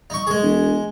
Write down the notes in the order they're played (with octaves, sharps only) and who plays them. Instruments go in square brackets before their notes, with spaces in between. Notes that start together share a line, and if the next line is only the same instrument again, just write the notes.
[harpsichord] D#4 C#6
G#3 G#4
[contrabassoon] E1